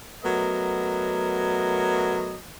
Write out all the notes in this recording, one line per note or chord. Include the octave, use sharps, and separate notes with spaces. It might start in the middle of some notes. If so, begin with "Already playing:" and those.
F#3 A3 B3 A#4 D#5